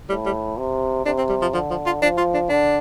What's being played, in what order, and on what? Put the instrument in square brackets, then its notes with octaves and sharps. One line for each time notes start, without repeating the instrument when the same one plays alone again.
[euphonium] A2 [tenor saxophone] G3
[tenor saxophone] G3
[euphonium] C3
[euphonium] C3 [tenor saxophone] D4
[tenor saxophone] C4
G3
F3
[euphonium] D3 [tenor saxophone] F3
[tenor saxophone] F3
F4
[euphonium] F3 [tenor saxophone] D4
[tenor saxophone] F4
D4
[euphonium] D3 [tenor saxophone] D4